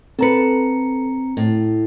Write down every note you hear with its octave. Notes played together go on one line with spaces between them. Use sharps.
C4 A4 B4 A#5 C#7
A2